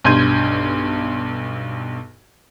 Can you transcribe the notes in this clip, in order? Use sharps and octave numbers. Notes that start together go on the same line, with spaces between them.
B1 G2 C6 G6 G#6 D#7